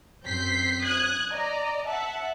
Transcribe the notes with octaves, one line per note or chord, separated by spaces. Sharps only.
F#2 C4 G6 B6 C7
D#6 F#6 G#6
D5 D#5 A#5
E5 F#5 A5